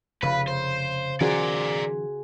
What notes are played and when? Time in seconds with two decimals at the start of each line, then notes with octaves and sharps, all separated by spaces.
0.23 F1 C#3 B4
0.48 C5
1.21 D#3 F3 C#4 F#4 G#4 A#4 C5 D5